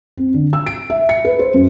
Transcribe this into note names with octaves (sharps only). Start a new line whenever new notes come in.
C4
D3
E6
D7
E5
C#7
B4
C5
F#2